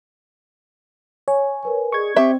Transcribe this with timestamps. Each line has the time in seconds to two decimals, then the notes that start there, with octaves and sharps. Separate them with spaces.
1.28 C#5 G#5
1.63 A#4 B4 G#5
1.92 G#4 D5 D#5 C#6 G#6
2.16 C4 G4 E5